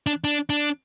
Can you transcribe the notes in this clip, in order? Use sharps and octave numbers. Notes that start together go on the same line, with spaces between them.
D4
D4
D4